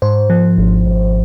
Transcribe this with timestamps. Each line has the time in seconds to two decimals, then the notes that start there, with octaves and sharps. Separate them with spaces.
0.02 G#2 C5
0.30 F3
0.58 G#1
0.86 G#1